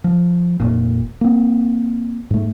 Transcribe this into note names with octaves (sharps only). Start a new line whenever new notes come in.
F3
F1 A#2
A#3 C4
G#2 A3